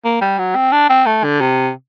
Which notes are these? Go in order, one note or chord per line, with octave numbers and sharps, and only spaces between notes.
A#3
G3
F#3
C4
D4
C4
A3
D3
C3